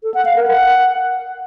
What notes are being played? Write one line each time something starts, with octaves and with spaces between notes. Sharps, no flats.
A4
F#5
F5
A#4
F#5